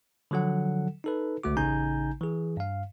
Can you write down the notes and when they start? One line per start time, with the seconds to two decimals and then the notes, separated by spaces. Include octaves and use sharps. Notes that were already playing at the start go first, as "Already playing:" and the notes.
0.31 D3 F3 F#3 A4 F#5
1.04 D#4 A4 B4
1.43 C#2 D3 A3 F#4 D6
1.57 A1 C#3 D#4 G#5 A#5 G6
2.21 E3 G#4
2.57 G2 F5